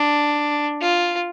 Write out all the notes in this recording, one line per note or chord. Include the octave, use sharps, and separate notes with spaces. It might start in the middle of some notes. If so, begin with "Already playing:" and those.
Already playing: D4
F4